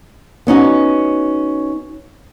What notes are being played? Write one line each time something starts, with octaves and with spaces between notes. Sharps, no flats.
B3 C#4 D#4 F#4